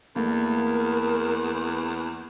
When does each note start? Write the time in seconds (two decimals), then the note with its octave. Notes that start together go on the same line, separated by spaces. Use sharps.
0.16 E2 A3 A#3 D4 A#4